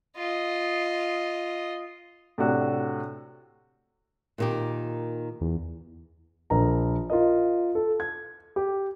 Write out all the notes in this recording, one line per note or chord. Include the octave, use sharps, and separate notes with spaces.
F4 D#5
A2 C3 D4 F#4
A#2 D#3 G4
E2
A#1 A#4 A#5
F4 A#4 D#5
A4
G#6
G4